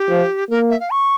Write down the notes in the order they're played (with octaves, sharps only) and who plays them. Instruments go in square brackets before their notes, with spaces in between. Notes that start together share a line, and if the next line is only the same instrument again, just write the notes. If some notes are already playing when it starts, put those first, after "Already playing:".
Already playing: [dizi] G4
[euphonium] F3
[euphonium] A#3 [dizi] A#4
[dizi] E5
F5
C#6